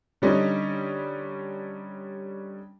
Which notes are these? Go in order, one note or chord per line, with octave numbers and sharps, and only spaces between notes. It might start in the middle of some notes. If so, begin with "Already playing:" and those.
D3 G3 C#4 D#4